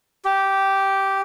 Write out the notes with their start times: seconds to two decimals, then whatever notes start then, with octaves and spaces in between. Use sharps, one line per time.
0.25 G4